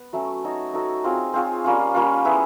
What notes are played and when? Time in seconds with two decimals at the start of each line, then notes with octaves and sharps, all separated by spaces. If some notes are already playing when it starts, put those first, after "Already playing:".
Already playing: B3
0.13 F#3 A3 C#4
0.44 D#4 F#4 A4 C#5
0.74 D#4 F#4 A4 C#5
1.04 C4 F4 G#4 C#5
1.34 C4 F4 G#4 C#5
1.64 G3 A#3 C#4 F4
1.94 G3 A#3 C#4 F4
2.25 B3 E4 G#4